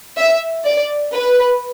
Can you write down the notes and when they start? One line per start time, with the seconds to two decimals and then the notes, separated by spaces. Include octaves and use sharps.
0.18 E5
0.65 D5
1.14 B4